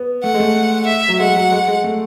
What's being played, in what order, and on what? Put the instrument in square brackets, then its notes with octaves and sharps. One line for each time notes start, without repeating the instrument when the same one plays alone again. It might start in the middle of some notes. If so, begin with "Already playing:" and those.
Already playing: [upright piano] B3
[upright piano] A3 [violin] F#5
[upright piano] G#3
A3
[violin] E5
[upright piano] F#3
[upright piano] G#3 [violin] F#5
[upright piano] F#3
G#3
G#3
A3